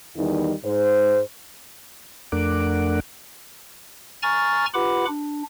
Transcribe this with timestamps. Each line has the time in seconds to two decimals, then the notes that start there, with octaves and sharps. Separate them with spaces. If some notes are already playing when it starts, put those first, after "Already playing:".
0.16 E2 D#3 E3 G3 D#4
0.64 G#2 C5
2.32 F2 A3 D4 A#4 F#5 D6
4.23 G#5 A#5 C#6 F6 A6
4.74 F4 G4 B4 F#5 B5 D6
5.08 D4